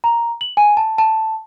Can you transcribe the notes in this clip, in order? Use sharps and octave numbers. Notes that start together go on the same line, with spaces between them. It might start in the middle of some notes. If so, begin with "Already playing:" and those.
A#5
F#7
G#5
A5
A5